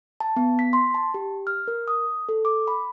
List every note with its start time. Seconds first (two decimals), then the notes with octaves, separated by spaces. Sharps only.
0.20 A5
0.36 B3
0.59 B6
0.73 C6
0.94 A5
1.14 G4
1.47 F6
1.68 A#4
1.88 D#6
2.29 A4
2.45 D6
2.68 B5